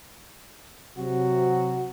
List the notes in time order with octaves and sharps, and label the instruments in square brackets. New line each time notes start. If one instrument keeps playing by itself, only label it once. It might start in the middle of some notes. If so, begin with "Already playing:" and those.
[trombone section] C3 F#3 [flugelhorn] F#4